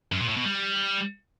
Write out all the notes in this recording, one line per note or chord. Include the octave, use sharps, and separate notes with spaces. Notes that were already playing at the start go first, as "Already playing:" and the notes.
F#2
A#2
A2
B2
G3